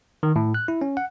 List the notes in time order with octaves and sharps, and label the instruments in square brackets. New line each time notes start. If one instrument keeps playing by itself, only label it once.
[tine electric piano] D#3
A2
F#6
E4
C#4
F#5